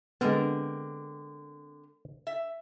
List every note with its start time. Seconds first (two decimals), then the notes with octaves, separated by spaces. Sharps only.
0.21 D3 G#3 B3 C4 A#4
2.27 E5